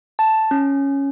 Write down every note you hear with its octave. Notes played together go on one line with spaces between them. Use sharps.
A5
C#4